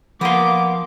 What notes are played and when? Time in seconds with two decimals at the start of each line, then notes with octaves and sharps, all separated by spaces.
0.21 F3 A#3 B3 A#4 C6 D6